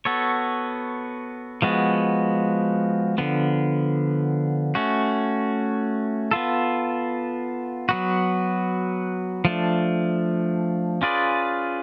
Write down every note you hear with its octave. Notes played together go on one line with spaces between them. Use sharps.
B3 F#4 A4 C#5
F3 G#3 B3 F#4
D3 F3 B3
A3 C#4 F#4
B3 F4 A4
F#3 B3 F#4
F3 A3 D4
C#4 F4 G#4 B4 D5